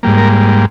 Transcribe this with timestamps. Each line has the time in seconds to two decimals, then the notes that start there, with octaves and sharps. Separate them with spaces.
0.03 G#2 G3 A#3
0.18 A#4